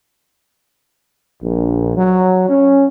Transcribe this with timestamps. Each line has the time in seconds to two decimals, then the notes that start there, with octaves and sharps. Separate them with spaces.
1.42 A#1
1.96 F#3
2.49 C#4